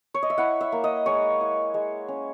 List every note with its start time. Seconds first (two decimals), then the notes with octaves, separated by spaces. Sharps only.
0.14 C#5
0.22 D#5
0.30 E5
0.38 E4 F#5
0.61 E5
0.72 A#3
0.84 D#5
1.06 G#3 C#5
1.41 E4
1.74 G#3
2.08 C#4